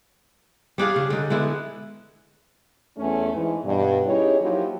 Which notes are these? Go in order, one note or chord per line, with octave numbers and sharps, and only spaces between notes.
G3 D4 G#4 F5
C#3
D3 D#4
D3 G#3 B3 E4
E2 A3 C#4
G#2 E3
G2 B2
C#4 D#4 E4 G4 G#4 C#5
F3 F#3 A#3 D#4 E4 G4